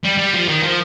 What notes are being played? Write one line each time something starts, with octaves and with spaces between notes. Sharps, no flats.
G3
G3
F3
D#3
F3